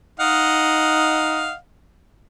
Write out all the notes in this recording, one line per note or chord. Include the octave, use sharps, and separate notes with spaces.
D#4 D#5 F5 F#5